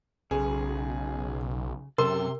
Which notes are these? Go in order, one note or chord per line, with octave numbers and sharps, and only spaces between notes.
B1 C#3 G#4
F#2 C3 A4 A#4 C6